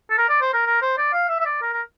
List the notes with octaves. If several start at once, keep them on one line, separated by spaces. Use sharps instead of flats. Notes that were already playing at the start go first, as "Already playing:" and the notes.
A4
A#4
D5
C5
A#4
A#4
C5
D5
F5
E5
E5
D5
A#4
A#4